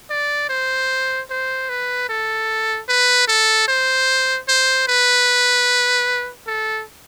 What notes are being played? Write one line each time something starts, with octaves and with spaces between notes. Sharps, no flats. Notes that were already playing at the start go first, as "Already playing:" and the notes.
D5
C5
C5
B4
A4
B4
A4
C5
C5
B4
A4